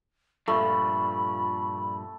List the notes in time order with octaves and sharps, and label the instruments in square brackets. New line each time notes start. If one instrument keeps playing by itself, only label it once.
[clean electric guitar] G2 A#2 F3 [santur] A3 [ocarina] B5